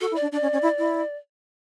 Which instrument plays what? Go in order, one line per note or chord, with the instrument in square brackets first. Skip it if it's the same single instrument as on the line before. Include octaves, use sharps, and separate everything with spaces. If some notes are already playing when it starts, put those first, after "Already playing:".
[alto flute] F#4 [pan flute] A4
[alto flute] E4
[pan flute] D5
[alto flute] D4
[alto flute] D4 [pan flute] D5
[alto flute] C#4
C#4
E4
E4